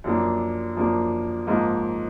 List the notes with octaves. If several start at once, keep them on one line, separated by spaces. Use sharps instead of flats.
F#2 F3 A#3 D4
F#2 F3 A#3 D4
G#2 F3 A#3 D#4